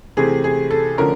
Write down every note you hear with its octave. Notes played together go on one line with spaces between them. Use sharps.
C3 E3 A3 C4 G#4
G#4
A4
D3 F3 A3 C#4 A#4